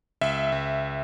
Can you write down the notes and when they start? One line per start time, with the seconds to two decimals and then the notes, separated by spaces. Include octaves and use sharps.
0.21 C#2 E5
0.52 C#2